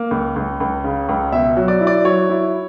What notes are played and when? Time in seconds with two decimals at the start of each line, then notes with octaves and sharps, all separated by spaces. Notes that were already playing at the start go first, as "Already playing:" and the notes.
Already playing: A#3
0.11 C#2
0.36 C#2
0.60 C#2
0.84 C#3
1.09 C#2
1.32 B2 E5
1.57 F#3
1.68 D5
1.81 E4
1.87 D5
2.05 F#3 C#5
2.30 E4